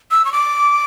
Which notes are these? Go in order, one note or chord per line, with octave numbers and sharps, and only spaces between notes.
E6
C#6
D6